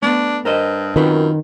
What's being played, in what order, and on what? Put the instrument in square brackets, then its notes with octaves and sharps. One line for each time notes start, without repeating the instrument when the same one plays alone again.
[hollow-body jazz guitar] A3 B3 [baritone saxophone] D4
[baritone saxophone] G2 [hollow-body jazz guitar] A#4 C5 D#5
[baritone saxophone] F#2 [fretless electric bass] D#3 [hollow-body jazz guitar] C4 F4 B4